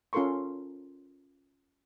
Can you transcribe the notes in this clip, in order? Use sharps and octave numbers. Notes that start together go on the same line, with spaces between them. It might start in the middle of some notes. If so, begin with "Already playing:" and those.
C#4 F4 A4 A#4 C6 C#6